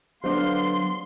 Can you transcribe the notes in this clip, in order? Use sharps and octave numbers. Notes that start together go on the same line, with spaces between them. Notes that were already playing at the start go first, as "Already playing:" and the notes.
D3 F#3 B3 D4 C5 F5 C6